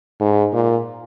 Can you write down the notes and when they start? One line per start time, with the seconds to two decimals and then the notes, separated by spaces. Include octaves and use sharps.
0.21 G#2
0.53 A#2